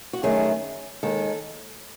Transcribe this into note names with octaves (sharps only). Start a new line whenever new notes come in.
F#4
F#2 D#3 A3 G#4
D#2 D#3 G#3 A4